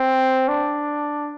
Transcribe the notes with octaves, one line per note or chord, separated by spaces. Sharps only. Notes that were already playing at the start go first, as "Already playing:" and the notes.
Already playing: C4
D4